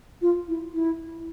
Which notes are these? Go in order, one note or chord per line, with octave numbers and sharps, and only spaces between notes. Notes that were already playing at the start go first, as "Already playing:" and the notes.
F4
E4
E4